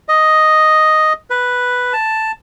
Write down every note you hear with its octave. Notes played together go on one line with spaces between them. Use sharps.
D#5
B4
A5